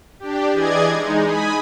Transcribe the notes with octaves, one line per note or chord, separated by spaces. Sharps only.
D4 G4
E3 G#4 D5 D#5 G#6
G#3 D#4
G#5 B5 D#6